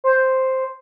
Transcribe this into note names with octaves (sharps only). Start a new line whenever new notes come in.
C5